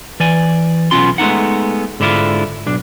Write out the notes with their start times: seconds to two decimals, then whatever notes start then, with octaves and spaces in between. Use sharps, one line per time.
0.20 E3 D5 G#5
0.91 B1 B3 C#4 F4 C6
1.18 G#3 A3 B3 D#4 F#5
2.00 G#2 D3 D4 E4 F4
2.66 B1 D4